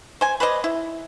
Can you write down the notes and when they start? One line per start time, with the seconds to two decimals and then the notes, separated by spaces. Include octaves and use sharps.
0.21 C5 G#5
0.40 B4 C5 D5 D#5
0.64 E4